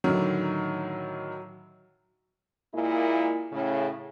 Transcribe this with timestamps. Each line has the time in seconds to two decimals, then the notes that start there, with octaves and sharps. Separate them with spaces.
0.04 A2 D3 D#3 F#3
2.74 A#2 G#3 A#3 E4
3.51 A2 C#3